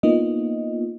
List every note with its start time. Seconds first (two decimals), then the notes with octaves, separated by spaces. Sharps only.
0.03 A#3 B3 D#4 F4 D#5